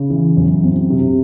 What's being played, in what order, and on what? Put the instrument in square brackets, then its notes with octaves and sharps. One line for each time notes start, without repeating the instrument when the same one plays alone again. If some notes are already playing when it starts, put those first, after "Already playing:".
Already playing: [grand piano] C#3
E3
F#2
C4
C3